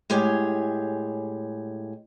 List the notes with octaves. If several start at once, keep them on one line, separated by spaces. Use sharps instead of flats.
A2 G#3 G4 G#4 C#5